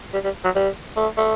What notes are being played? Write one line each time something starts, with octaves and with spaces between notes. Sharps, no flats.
G3
G3
F#3
G3
A3
A3